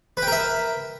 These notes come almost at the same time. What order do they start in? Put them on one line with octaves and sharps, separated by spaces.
B4 G5 A#4 E5